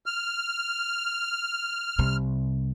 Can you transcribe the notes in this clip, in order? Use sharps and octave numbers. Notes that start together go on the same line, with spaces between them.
F6
C2 C3